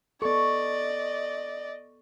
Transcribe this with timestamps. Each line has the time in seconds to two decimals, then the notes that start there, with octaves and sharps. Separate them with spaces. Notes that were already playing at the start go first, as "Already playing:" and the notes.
0.22 B3 A4 D5 D#5 C#6